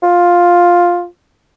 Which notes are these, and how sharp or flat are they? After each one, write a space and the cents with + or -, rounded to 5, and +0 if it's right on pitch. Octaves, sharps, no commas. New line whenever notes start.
F4 +5